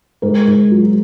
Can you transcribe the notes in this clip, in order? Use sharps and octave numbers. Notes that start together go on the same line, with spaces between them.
G#2 A#4
G#2
F#3